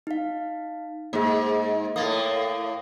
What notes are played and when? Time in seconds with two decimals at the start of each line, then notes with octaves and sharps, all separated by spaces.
0.07 D#4 F5
1.13 G#2 A#3 G#4
1.96 A2 A#3 D#6 A6